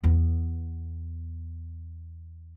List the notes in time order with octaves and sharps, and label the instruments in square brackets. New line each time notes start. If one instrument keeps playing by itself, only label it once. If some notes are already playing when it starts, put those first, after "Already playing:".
[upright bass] E2 B3